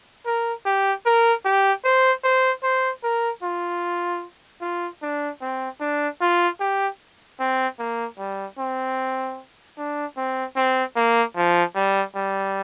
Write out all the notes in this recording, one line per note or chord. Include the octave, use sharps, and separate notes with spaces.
A#4
G4
A#4
G4
C5
C5
C5
A#4
F4
F4
D4
C4
D4
F4
G4
C4
A#3
G3
C4
D4
C4
C4
A#3
F3
G3
G3